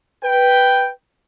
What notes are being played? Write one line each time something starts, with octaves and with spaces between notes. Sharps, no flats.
B4 G5